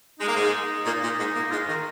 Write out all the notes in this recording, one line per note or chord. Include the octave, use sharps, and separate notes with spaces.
G#3 D#4
A#3
G#2 G#3
A#2 A#3
A#2 A#3
G#2 G#3
A#2 A#3
G#2 G#3 F4
D#3 A#4